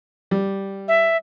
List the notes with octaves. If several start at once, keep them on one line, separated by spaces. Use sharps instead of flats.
G3
E5